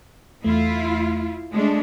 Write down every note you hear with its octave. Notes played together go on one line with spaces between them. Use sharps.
E2 A3 E4 F4
G#3 A3 D4